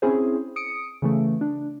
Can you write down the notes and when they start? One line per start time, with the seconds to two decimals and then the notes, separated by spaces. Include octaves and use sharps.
0.02 C4 C#4 E4 G#4 C5
0.56 D#6 C#7 D7
1.02 C#3 E3 A3
1.41 D4